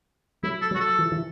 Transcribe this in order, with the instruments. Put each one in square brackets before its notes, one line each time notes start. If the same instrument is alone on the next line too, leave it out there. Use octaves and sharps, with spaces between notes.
[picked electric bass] F#3 [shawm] E4
[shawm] A4
[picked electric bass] F#3
[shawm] F#4
A4
[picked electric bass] E3
E3